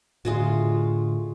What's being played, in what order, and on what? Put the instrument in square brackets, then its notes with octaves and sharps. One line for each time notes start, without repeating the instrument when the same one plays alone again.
[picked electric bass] A2 D3 [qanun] G#3 F4 F#4